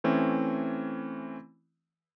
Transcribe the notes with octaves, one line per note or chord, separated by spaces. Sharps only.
E3 A3 C4 C#4